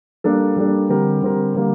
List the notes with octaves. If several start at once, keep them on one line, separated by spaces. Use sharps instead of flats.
G3 A#3 D4 A4
G3 A#3 D4 A4
D3 G3 C4 G4 A#4
D3 G3 C4 G4 A#4
D3 G3 A#3